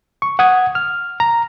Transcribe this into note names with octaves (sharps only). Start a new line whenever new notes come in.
C#6
F#5 D#6 G#6
F6
A#5